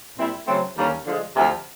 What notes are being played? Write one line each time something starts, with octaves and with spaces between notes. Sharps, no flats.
A#2 G3 C4 E4
C#3 F#3 A3 C4
D#2 D3 G3 A#3 C#4
D3 F3 G#3
D2 C3 F3